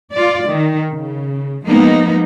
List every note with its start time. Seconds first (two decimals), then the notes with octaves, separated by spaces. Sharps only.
0.13 F4 D5
0.50 D#3
0.92 C#3
1.66 F3 G#3 A#3 B3 D#4